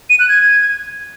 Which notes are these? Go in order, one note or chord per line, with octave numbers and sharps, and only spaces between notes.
D#7
F#6
G#6